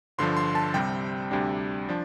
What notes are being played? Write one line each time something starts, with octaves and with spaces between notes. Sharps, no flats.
G1 G2 D3 F3 C6
C6
A5
C2 C3 G3 C4 G5
D2 C3 G3 D4
F3 D4